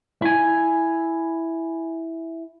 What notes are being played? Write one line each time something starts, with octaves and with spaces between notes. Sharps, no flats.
E4 G#5